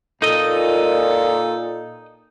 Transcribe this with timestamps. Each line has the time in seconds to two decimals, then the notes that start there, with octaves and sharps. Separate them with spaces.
0.22 A#2 D#4 A4 D#5